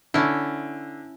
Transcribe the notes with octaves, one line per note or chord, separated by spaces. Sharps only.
D3 C#4 E4